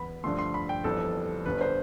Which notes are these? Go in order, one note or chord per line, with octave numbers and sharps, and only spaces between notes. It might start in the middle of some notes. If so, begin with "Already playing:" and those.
Already playing: E2 B3 B5
G2 D3 F3 A3 C6
C6
B5
G5
G1 F2 E3 G3 A4
G1 G2 D3 B4
C5